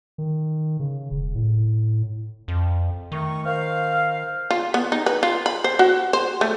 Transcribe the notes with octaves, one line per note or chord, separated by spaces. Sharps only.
D#3
C#3
E1
A2
F2
D#3 A3 C#6
A#4 C5 F5
F4
B3
D#4
B4
F4
B5
C5
F#4
C5
A3